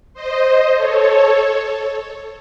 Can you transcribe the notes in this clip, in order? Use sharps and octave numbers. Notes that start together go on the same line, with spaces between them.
C5 D#5
A4 C#5